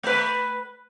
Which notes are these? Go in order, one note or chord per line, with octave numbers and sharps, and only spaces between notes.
A3 B4